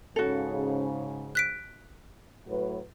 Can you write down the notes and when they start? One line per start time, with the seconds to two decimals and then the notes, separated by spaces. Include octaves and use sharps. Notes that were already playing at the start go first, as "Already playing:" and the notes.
0.16 G#2 C#3 F#4 A4
1.35 F#6 B6 D7
2.47 A2 F#3 B4